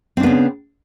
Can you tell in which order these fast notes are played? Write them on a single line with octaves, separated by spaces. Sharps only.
C4 D4 B3 C#3